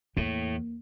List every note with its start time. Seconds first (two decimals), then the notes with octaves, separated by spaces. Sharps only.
0.17 E2 A2 A#3